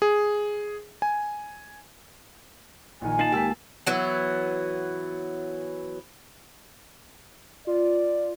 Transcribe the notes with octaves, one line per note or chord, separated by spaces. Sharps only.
G#4
G#5
A#1 D#3 G#5
A#3 D#4 F4 A5 C7 F#7
C#2 D#3 G4 E6 B6
E3 F#3 B3
F4 D5